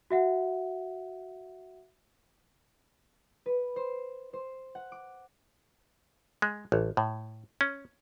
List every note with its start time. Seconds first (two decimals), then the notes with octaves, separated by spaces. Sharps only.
0.11 F#4 E5 F#5
3.46 B4
3.76 C5
4.33 C5
4.75 F#5
4.92 D6
6.42 G#3
6.72 A1
6.97 A2
7.61 C#4